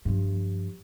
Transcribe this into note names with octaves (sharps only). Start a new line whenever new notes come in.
G2 F3